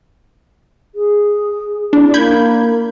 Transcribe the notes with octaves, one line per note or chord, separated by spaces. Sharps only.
G#4
D4 E4
A#3 B5 G6 G#6